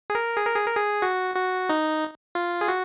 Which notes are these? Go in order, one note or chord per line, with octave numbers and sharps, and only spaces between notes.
G#4
A#4
G#4
A#4
G#4
A#4
G#4
F#4
F#4
D#4
F4
G#4
F#4